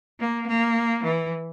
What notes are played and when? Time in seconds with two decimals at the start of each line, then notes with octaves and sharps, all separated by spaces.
0.20 A#3
0.47 A#3
1.04 E3